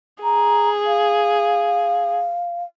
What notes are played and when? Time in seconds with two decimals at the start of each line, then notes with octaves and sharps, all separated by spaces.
0.24 G#4 A#5
0.86 F5